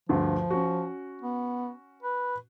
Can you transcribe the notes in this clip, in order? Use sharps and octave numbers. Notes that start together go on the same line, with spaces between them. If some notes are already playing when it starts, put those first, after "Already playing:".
D2 G2 F3
C#4 F#4
B3
B4